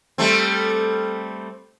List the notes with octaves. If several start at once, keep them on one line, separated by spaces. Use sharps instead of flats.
G3 A3 C4